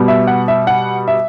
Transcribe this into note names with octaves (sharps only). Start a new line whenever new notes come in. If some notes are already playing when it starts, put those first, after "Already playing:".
Already playing: B2 G3 B3
E5
F#5
E5
F#5
E5